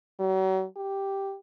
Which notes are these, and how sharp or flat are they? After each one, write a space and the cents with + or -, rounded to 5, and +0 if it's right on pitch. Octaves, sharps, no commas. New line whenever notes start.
F#3 +40
G4 +0